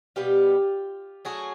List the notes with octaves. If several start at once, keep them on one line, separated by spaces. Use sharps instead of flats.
B2 G3 B3 F4 G4
F#3 A3 C#4 F#4 G#4